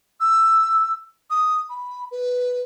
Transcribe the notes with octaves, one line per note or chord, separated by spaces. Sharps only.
E6
D#6
B5
B4